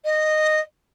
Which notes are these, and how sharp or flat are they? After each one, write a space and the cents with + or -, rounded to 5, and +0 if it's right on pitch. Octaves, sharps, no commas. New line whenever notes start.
D#5 -10